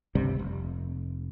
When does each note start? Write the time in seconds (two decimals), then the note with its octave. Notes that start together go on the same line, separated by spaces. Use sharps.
0.15 G1 C#2 C3 G3
0.39 F1